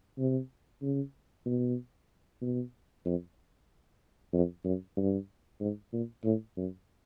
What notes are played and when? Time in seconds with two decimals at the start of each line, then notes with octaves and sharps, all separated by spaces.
0.19 C3
0.82 C#3
1.46 B2
2.42 B2
3.06 F2
4.33 F2
4.65 F#2
4.97 G2
5.60 G#2
5.93 A#2
6.24 A2
6.57 F#2